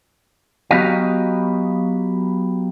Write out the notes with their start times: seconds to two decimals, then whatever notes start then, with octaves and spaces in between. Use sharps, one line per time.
0.71 F#3 B3 F#4 G4 D#5 F5